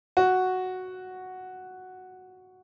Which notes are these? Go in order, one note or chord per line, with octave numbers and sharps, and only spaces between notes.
F#4